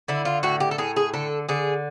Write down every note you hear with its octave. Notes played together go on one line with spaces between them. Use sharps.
D3 E4
F4
A2 F#4
G4
A4
A2 G#4
G#4
D3 A4
D3 G#4